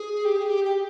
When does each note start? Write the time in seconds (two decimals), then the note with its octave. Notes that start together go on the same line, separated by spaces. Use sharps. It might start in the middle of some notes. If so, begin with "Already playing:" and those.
Already playing: G#4
0.25 G4
0.37 G#4
0.50 G4
0.64 G4